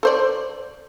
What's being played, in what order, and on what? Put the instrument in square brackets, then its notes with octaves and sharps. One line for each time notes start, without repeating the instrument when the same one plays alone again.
[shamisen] A4 C5 D5